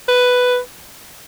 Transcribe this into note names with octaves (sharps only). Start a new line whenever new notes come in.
B4